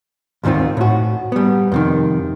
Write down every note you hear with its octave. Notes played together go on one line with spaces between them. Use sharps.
D2 G#2 D#3 C4 F4
A2 F#4
G3 B3
F2 C3 D#3